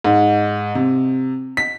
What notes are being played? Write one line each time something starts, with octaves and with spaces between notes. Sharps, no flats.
G#2
C3
B6